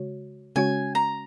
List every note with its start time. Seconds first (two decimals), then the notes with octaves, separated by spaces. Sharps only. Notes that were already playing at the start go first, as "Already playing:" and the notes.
Already playing: C#3 G#3 F#4 C#5
0.56 C#3 G#3 C#4 F#4 C#5 G#5
0.95 A#5